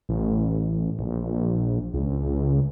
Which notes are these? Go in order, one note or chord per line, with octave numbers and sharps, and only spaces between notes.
A1
A#1
C#2